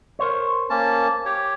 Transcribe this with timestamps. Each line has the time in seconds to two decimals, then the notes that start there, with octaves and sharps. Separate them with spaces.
0.19 A#4 C5 C#5
0.70 A#3 C#4 A5
1.26 G4 C#5